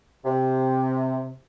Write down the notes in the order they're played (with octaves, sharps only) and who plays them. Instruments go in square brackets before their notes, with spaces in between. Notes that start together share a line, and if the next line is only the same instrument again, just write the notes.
[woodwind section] C3